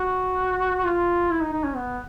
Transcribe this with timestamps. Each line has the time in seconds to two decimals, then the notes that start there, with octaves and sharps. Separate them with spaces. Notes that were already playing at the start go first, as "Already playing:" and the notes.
Already playing: F#4
0.85 F4
1.30 E4
1.41 D#4
1.52 D#4
1.64 C#4
1.76 B3